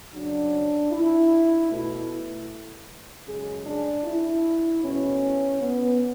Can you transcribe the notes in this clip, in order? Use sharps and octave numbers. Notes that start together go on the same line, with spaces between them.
F#2 C#3 F#3 D4
E4
B2 A3
F#2 C#3 G#3 G#4
D4
E4
E2 B2 A3 C#4
B3